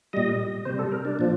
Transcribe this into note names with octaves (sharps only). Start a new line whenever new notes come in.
A#2 G3 D#5
C3 G3 C5
A4
A#4
D4
A#2 F3